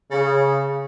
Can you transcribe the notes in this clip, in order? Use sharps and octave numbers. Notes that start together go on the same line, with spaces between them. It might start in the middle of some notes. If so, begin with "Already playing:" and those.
C#3